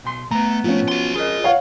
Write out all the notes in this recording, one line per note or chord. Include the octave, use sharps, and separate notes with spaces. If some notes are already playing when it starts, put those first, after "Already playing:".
B1 C6
A3 B3 A#5
A2 F3 A3 C#4
F#4 C6
F4 G#4 A#4 D#5
C#5 F5 F#5